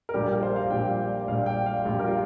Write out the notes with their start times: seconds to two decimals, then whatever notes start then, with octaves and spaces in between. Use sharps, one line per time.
0.09 A#4
0.14 A#1 A#2 G3 D4 G4
0.28 A#4
0.43 C5
0.56 F5
0.70 A#1 A#2 G3 D4 G5
1.28 A#1 A#2 G3 D4 F5
1.46 G5
1.66 F5
1.85 A#1 A#2 G3 D4
1.94 G4
1.99 A#4
2.08 F4